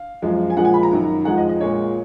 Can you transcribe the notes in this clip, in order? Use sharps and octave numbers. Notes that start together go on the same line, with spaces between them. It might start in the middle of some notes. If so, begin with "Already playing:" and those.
Already playing: F5
F#2 F3 G#3
G#5
A#2 F3 G#3 F#5
G#5
B5
A#5
F#2 D#3 F#3
F2 F3 G#3 F#5
D#5
D#5
A#2 G#3 C#5